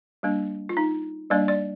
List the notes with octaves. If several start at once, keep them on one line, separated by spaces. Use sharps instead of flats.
G3 A#3 D4
F4
D#4
G3 A#3 D4 D5
D5